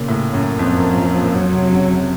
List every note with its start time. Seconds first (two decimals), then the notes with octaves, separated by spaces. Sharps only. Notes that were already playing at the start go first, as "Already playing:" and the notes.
Already playing: A#2 C#3
0.08 A2
0.34 F#2
0.59 F2 F3
0.78 F#2
0.97 F#2
1.16 A#2
1.35 F2 F#3
1.53 C3
1.72 C#3
1.91 C3